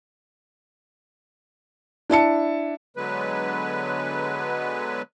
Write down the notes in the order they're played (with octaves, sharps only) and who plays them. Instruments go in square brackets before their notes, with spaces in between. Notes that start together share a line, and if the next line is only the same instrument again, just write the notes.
[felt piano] D4 E4 A5 C#7
[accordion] D3 F#3 G#3 B3 B4